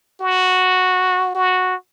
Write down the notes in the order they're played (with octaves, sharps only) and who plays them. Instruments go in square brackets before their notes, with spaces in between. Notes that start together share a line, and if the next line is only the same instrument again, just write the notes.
[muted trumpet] F#4
F#4